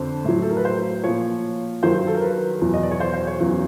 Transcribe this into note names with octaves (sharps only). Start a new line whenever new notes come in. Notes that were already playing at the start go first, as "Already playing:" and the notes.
Already playing: F2 D3 C5
A2 F#3
A4
A#4
B4
C5
A#2 F3 C#5
G2 D#3 F#3 C5
A4
A#4
B4
E2 B2 F#3
D#5
D5
C#5
C5
C5
C#5
E2 C#3 F#3